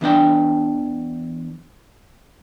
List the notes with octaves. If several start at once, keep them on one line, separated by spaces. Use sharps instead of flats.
E2 E3 D4 G5